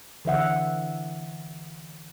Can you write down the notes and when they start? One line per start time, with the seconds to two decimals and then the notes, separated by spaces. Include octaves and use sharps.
0.25 D3 E3 E5 F#5